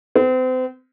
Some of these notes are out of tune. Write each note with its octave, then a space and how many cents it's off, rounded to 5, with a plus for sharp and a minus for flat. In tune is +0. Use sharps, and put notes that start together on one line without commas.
C4 -35